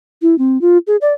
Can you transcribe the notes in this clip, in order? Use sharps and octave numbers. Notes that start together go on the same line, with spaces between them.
E4
C4
F4
G#4
D5